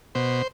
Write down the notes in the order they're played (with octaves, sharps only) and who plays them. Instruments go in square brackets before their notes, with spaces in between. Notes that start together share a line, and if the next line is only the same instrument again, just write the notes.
[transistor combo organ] B2 C5